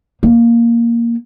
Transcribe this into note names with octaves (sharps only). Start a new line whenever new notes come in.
A#3